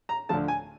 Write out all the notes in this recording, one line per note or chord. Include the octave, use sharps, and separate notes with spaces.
A#5
D2 D3 F3 A3 A5
G#5